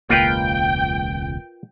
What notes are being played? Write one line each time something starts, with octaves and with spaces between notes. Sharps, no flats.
E1 C#2 A#3 F4 A#4 B4 G5